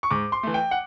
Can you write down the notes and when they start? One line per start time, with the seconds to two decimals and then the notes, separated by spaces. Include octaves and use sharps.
0.03 C#6
0.11 G#2 D6
0.32 C6
0.43 E3 A3
0.54 G5
0.71 F#5